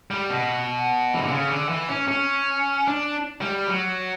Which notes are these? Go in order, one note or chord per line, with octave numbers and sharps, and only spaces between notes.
G3
B2
E3
D3
C#3
D3
E3
C#4
C#4
D4
G3
F#3